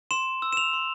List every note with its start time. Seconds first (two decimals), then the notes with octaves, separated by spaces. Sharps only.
0.11 C6 E7
0.42 E6
0.53 E7
0.57 F7
0.73 C6